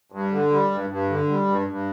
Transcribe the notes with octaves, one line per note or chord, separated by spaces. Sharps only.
G2
D3
G3
G2
G2
D3
G3
G2
G2